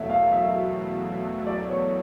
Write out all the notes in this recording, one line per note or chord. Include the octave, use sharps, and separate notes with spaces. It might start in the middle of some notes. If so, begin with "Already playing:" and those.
Already playing: E2 B2 F#3 A3 E5
F5
E5
D5
C#5